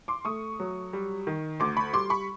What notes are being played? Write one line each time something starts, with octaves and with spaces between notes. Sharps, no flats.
C6 D6
A3 C#6 D#6
F#3
G3
D#3
D2 C6 D6
B5 C#6
G3 C6 D6
B5 C#6